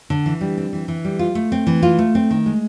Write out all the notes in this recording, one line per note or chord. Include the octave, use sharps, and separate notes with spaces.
D3
E3
G3
C4
E3
E3
G3
F4
A3
C4
E3
F4
A3
C4
D#3
G#3